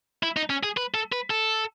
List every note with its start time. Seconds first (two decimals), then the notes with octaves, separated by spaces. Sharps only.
0.23 E4
0.37 D#4
0.50 C#4
0.63 G#4
0.77 B4
0.94 A4
1.12 B4
1.30 A4